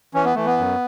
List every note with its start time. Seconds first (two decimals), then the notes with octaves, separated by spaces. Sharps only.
0.14 E3 C#4
0.24 B3
0.35 E3 A3
0.46 B3
0.58 F#2